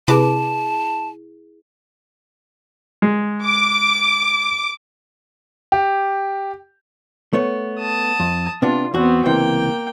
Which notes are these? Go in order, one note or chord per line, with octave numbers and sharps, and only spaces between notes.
C3 E4 G#4 B4 A5 D6
G#3
D6
G4
A3 B3 C#5
A5 D#6
F2
C3 B3 D4 F4
E2 B3 C4 F#4
C#2 C3 E3 A#3 G5